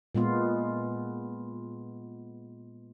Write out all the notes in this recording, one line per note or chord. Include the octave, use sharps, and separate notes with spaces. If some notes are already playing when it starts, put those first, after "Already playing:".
A#2 G#3 B3 F4